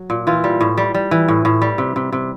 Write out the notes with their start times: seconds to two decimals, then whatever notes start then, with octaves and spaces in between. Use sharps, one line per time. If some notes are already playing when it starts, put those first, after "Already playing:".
Already playing: F#3
0.10 A#2
0.27 E3 F4
0.44 G3
0.61 A2
0.77 G3
0.94 G3
1.11 E3
1.28 A2
1.45 A2
1.62 G3
1.78 C3
1.96 C3
2.12 C3